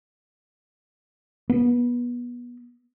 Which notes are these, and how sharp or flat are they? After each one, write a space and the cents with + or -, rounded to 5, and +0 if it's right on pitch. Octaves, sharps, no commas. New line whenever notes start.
B3 -25